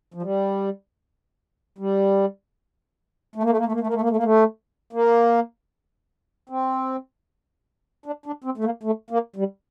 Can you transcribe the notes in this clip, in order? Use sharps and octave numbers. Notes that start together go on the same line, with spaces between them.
F3
G3
G3
A3
A#3
A3
A#3
A3
A#3
A3
A#3
A3
A#3
A3
A#3
A3
A#3
C4
D4
D4
C4
A3
A#3
A3
A#3
G3